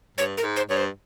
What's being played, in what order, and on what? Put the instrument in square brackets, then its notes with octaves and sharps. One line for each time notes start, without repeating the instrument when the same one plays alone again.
[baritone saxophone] G2 [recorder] C#5
[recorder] A#4
[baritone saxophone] G#2
[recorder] C5
[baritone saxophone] G2 [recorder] C#5
[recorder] C5